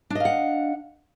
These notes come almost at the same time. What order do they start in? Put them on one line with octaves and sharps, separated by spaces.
D4 D#5 F5 F#5